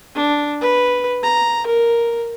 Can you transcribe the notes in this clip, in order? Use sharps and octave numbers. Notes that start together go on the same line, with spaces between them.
D4
B4
A#5
A#4